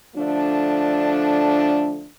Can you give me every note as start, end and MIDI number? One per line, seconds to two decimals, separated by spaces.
0.16 2.08 50
0.16 2.08 53
0.16 2.08 57
0.16 2.08 62